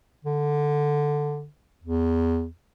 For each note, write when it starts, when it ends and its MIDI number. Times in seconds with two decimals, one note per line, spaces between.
0.25 1.47 50
1.84 2.47 40